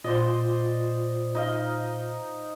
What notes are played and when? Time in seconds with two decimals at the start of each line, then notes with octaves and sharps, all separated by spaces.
0.04 A#2 F4 C5 D5 D#5
1.35 D#4 D#5 F5